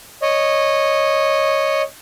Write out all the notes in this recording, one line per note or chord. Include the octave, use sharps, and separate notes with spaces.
C#5 D#5